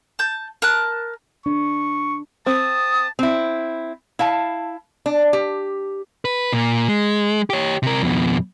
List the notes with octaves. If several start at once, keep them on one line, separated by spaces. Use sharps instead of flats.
A5 G6
A#4 A5 F#6
D4 C#6
C4 A5 D#6
C4 E4
E4 F5 A5
D4
G4
B4
A#2
G#3
G4 C#5
C3 A#4
F2 B2